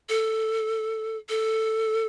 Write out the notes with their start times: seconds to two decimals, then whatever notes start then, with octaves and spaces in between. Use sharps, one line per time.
0.09 A4
1.29 A4